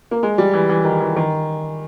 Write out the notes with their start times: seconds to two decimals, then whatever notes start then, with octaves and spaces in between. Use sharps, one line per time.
0.11 A#3
0.23 G#3
0.38 G3
0.54 E3
0.69 E3
0.85 D#3
1.01 E3
1.16 D#3